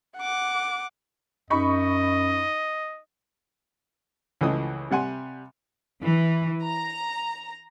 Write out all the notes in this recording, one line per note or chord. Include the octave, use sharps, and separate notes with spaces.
F#5 D6
F#2 D#4 D#5 B5 C#6
C#2 E3 F3 A3 D#5 D#6
C3 G3 F#5 G#5 C6
E3
A#5